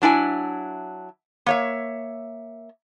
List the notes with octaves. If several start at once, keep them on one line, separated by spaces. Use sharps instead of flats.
F#3 D4 E4 G#5
A#3 C#5 E5